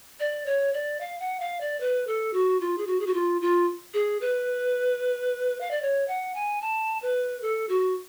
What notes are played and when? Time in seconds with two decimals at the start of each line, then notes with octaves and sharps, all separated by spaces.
0.20 D5
0.46 C#5
0.74 D5
1.00 F5
1.20 F#5
1.40 F5
1.61 D5
1.80 B4
2.07 A4
2.33 F#4
2.60 F4
2.78 G#4
2.87 F#4
3.00 G#4
3.06 F#4
3.14 F4
3.41 F4
3.94 G#4
4.21 B4
5.61 F5
5.71 D5
5.82 C#5
6.08 F#5
6.35 G#5
6.62 A5
7.02 B4
7.42 A4
7.69 F#4